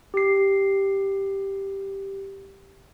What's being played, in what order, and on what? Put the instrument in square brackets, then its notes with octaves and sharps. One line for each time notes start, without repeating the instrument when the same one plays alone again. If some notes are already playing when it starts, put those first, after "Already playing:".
[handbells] G4 C7